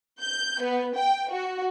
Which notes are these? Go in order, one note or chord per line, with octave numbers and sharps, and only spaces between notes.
G6
B3
G5
F#4